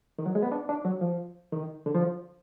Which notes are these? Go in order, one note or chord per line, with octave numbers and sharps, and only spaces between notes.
D#3
F#3
G#3
B3
D4
D4
F#3
F3
D#3
D3
F3